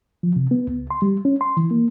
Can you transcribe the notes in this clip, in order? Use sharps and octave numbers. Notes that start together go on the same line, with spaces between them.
F3
C3
B3
C#2
C6
G3
C#4
C6
E3
A#3